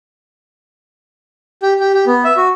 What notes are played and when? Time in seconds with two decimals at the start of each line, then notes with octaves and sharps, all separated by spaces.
1.62 G4
1.80 G4
1.94 G4
2.07 B3
2.24 E5
2.37 F#4